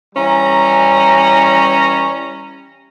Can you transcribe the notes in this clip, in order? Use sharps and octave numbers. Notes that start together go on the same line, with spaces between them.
E3 G3 C#4 A#5